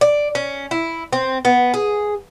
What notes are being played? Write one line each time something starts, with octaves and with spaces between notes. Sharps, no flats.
D5
C#4
E4
C4
B3
G#4